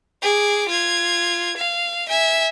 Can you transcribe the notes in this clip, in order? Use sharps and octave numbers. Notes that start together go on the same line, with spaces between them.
G#4 D6
F4 G#6
F5
E5 G#5